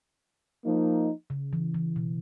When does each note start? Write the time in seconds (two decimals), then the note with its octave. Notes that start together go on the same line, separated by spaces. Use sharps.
0.65 F3 A#3 D#4
1.30 C#3
1.53 E3
1.74 E3
1.96 B2